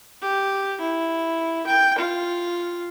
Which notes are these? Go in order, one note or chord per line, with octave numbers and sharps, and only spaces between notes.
G4
E4
G5
F4